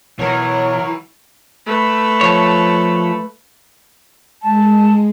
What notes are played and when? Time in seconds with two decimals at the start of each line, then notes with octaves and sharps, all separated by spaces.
0.19 B2 E3 F#3 A#4 C#5
1.66 A3 B4
2.21 F3 C#5
4.43 G#3 A5